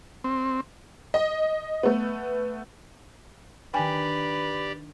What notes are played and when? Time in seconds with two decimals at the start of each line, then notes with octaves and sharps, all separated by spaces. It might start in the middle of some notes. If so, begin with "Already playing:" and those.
0.24 C4
1.14 D#5
1.83 A3 B3
3.74 D#3 D4 G4 B4 D5 G5 G#5